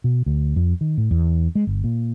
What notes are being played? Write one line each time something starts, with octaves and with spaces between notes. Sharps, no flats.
B2
D2
F2
D#3
A2
E2
G#3
G1
A#2